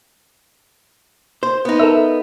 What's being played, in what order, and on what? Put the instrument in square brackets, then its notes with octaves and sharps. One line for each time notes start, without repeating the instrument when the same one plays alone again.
[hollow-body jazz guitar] C5
B3 D#4
[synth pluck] A4 A#4 E5